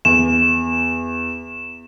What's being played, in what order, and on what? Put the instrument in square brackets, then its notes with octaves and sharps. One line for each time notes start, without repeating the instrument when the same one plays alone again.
[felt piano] E2 [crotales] E7